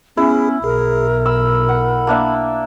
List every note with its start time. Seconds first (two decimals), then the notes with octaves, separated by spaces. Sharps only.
0.17 B3 C#4 E4 G#4
0.64 B1 G#4 A#4
1.26 B5 E6
1.69 F#5
2.07 A#3 D4 E5